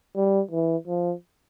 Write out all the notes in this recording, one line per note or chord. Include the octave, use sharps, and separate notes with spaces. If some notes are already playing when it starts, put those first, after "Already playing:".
G3
E3
F3